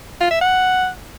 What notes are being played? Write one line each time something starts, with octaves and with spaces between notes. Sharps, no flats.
F4
E5
F#5